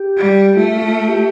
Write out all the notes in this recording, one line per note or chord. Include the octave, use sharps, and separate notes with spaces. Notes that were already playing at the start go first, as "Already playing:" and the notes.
Already playing: G4
G3
A3 F4
F4
G4